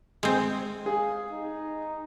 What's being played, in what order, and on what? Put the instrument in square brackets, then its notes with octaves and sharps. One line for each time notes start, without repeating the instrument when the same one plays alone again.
[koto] G#3 C4
[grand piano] G#4 [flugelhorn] F5
[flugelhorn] D#4